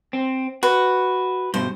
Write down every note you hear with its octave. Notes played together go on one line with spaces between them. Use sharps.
C4
F#4 B4
G2 B2 C5